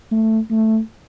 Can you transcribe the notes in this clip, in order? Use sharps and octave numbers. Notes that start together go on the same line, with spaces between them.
A3
A3